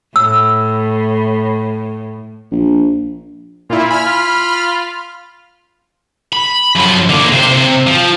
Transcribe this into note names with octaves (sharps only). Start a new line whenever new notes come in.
A2 E6
A#1
A#2 E4 F4
G#5 B5 F6
F4
B5
F#2 F3
D3 A#3
C3 C5
C3
F3